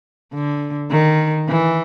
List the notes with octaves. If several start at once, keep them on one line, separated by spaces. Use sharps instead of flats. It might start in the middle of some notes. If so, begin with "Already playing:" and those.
D3
D#3
E3